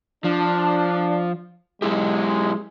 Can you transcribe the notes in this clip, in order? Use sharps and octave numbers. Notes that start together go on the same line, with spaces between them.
F3 D4
F#3 G#3 E4 G4